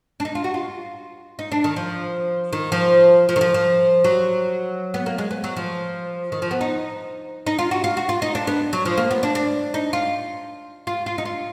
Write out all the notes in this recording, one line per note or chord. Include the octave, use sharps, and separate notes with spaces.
D4
D#4
F4
F#4
F4
D#4
D4
D#3
F3
D#3
F3
F3
D#3
F3
F3
F#3
B3
A#3
G#3
B3
F#3
F3
D#3
F3
B3
D#4
D#4
F4
F#4
F4
F#4
F4
D#4
D4
B3
F#3
F3
A#3
B3
D4
D4
D#4
F4
F4
F4
D#4
F4